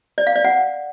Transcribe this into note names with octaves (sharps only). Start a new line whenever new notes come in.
D5
F5
D5
F#5